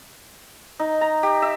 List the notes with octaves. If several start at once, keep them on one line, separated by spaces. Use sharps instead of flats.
D#4
A#5
G4
E5